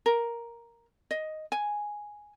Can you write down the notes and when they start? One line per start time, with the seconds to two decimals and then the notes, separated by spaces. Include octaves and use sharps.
0.06 A#4
1.11 D#5
1.52 G#5